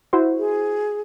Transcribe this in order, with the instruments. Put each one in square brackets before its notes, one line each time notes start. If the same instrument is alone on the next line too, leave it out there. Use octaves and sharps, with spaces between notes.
[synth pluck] E4 F#4 C5
[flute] G#4